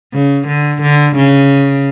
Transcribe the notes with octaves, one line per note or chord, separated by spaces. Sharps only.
C#3
D3
D3
C#3